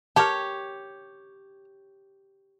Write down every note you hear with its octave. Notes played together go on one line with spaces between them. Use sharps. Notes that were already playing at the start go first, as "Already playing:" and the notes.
G4 A#4 C#5 A5